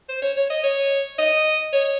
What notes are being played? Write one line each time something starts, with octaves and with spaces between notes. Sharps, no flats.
C5
C#5
C#5
D#5
C#5
D#5
C#5